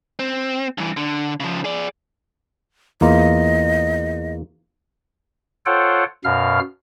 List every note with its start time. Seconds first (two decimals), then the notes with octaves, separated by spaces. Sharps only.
0.19 C4
0.78 G2 E3
0.97 D3
1.40 C#3 F3
1.65 G#4 D5
3.01 E2 A#3 F4 D#5
5.66 F4 A4 C5 C#5 F#5 G5
6.24 F#2 B2 F5 F6